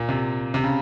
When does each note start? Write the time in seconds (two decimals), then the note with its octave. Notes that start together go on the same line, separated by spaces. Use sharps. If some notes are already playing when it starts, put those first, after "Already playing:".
Already playing: A#2
0.09 C3
0.54 C3
0.64 C#3